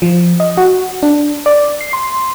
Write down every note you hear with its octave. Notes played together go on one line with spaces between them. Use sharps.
F3
D#5
F#4
D4
D5
C7
C6